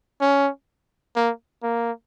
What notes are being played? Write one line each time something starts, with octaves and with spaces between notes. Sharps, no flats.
C#4
A#3
A#3